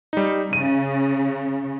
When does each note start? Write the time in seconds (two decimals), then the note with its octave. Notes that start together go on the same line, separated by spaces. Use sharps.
0.13 G3 D#4
0.53 C#3 D#7